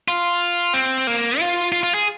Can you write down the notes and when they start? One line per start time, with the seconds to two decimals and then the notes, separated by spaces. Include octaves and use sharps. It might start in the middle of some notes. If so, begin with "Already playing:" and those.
0.08 F4
0.74 C4
1.07 A#3
1.39 F4
1.72 F4
1.83 F4
1.94 G#4